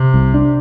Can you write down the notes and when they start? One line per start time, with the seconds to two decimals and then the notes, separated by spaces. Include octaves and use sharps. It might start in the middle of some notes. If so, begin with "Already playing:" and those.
Already playing: C3
0.14 C2
0.34 D4